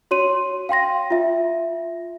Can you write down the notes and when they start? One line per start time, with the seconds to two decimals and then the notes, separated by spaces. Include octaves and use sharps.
0.11 F#4 C#5 C6 D#7
0.69 F5 G5 C6 A#6
1.11 F4 E5